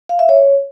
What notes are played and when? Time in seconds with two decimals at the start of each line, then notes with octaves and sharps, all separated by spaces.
0.09 F5
0.19 E5
0.29 C#5